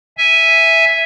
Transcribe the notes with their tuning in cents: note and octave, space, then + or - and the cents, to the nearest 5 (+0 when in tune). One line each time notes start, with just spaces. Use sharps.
E5 +0 G#5 +0